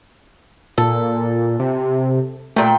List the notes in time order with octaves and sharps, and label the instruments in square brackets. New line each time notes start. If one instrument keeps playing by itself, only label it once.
[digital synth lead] A#2 [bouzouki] A4
[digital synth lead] C3
[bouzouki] A#2 G5 [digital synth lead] A3